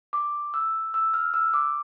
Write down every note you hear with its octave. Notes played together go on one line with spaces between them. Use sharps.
D6
E6
E6
F6
E6
D6